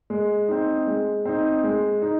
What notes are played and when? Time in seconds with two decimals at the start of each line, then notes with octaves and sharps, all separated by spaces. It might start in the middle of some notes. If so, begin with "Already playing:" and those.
0.10 G#3
0.48 C4 D#4
0.87 G#3
1.26 C4 D#4
1.64 G#3
2.02 D#4